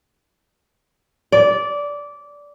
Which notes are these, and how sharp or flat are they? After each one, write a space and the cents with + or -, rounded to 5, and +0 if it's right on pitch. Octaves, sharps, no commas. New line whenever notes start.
D5 -15